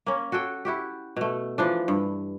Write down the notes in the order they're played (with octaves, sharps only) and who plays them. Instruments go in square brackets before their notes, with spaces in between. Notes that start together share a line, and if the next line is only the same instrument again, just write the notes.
[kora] A#3 C#4
F#4 G#4 A4 G5
E4 F#4 G4
B2 A3
E3 F3 D4
G2